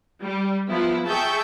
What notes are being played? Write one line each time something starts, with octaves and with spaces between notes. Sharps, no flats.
G3
F3 B3 E4
G#4 E5 G5 A5 C#6 G6